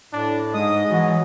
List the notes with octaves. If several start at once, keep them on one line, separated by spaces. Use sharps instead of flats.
A2 D4
G#2 G#3 D#5 D#6
E3 F#3